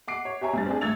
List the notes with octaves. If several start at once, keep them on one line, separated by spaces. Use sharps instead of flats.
F#5 D6 C7 D7
C#5
G4 C#5 E5 G#5 A#5
F1 G2 A6
C4 D4 G#4
G#1 A3 E6 G#6 A6 F7